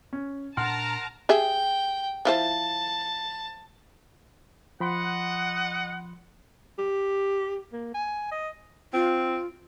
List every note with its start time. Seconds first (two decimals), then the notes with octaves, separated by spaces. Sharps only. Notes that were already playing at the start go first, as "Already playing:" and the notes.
0.13 C#4
0.57 A#2 D4 A#4 F#5 A5 A#5 C6 F6
1.29 G4 G#4 E5 G5
2.25 F3 E4 C5 A5
4.80 F3 D#5 F#5 B5 C6
6.79 G4
7.73 A#3
7.94 G#5
8.32 D#5
8.94 C4 F4